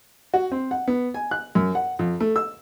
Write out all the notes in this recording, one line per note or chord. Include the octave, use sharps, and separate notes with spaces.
F#4
C4
F#5
B3
G#5
F#6
F#2
F#5
F2
A3
E6